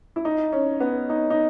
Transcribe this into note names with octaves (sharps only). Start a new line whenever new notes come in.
E4
D#4
C#4
B3
D#4
D#4